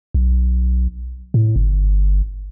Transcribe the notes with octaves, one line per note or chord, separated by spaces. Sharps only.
B1
A2
G1